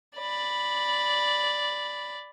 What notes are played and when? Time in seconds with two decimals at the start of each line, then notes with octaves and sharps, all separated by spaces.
0.18 D5 B5